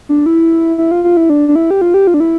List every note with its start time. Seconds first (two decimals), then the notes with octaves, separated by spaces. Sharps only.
0.09 D4
0.26 E4
0.78 E4
0.91 F4
1.04 F4
1.17 E4
1.30 D4
1.48 D4
1.56 E4
1.71 G4
1.81 F4
1.94 G4
2.07 F4
2.14 D4
2.20 E4